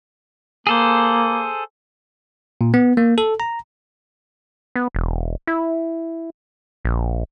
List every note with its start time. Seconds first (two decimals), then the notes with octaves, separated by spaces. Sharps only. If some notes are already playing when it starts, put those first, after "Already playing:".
0.67 A#3 G#4 A4 C5
2.61 A#2
2.74 B3
2.97 A#3
3.18 A4
3.40 A#5
4.76 B3
4.95 E1
5.47 E4
6.85 A#1